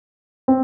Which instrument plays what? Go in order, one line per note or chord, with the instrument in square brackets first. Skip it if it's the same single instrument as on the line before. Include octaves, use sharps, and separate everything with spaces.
[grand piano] C4